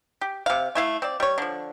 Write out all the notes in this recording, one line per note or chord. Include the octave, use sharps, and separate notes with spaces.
G4
C3 F5
A3 E4 F5
C4 D5
G3 C#5
D3 F3